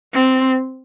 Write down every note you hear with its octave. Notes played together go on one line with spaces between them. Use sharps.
C4